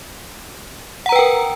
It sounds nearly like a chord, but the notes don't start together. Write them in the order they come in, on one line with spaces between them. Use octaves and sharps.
F#5 A#5 B4 G5 A#4